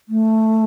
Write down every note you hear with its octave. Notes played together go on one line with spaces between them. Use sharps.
A3